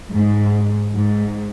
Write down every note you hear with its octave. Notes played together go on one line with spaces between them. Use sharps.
G#2
G#2